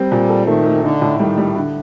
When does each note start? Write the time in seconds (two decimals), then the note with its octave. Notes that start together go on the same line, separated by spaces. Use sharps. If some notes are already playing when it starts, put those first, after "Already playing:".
Already playing: G3 C4
0.12 A#2
0.29 A4
0.47 D#3 A3
0.66 A3
0.83 D3 D#4
1.02 A2
1.19 D#3 G3
1.38 G3
1.56 D3